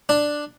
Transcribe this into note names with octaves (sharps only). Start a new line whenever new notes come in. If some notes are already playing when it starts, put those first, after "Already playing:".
D4